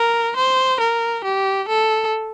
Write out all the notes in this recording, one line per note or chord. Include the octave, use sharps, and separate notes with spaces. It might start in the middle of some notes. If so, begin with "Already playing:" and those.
Already playing: A#4
C5
A#4
G4
A4